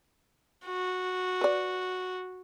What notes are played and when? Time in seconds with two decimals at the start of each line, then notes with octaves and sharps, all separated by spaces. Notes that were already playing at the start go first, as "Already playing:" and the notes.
0.66 F#4
1.41 B4 D5